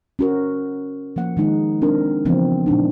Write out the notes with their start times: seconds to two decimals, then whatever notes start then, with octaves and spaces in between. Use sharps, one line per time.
0.19 C#4 F#4 A#4
1.16 F3 A#3 F#5
1.37 D#3 G#3 D#4
1.82 C4 D4 A#4
2.25 C#3 E3 F3 B3 C4
2.66 A#2 G#3 D4 D#4